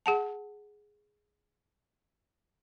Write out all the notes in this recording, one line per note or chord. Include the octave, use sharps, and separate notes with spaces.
G#4 F#5 A5